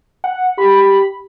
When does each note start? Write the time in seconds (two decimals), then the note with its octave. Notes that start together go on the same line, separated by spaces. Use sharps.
0.24 F#5
0.58 G4 B5